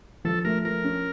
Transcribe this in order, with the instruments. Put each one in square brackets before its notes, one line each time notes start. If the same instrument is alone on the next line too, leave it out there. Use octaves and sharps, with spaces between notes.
[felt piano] F3 [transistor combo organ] A4
[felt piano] A3 [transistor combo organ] A#4
[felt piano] F3 [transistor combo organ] A#4
[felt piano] C#4